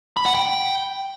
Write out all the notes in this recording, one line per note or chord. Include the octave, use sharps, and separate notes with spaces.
B5
F#5
G5